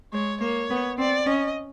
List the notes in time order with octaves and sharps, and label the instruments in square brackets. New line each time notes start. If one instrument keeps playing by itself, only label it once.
[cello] G#3 [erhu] C#5
[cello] A#3 [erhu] C#5
[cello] B3
[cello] C4 [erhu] D5
[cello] C#4 [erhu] D#5